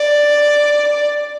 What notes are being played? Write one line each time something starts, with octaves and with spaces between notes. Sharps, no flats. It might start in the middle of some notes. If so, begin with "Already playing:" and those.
Already playing: D5